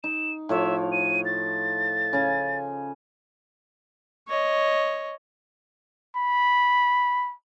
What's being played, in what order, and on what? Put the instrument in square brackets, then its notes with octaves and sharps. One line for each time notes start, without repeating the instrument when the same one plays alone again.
[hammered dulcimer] D#4 [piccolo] E7
[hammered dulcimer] A2 F3 C#5 [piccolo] E5
[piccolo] D#7
A6
[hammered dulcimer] C#3 G#5
[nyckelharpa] C#5 D#5
[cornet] B5